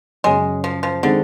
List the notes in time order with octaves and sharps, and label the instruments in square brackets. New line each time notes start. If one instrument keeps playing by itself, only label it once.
[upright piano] F#2 C#3 F#3 [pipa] G#3
[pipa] F3
F3
[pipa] D3 [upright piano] D#3 G#3 C4